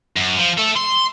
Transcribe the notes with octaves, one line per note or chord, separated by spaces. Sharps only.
F#2
F3
A4 E5
C6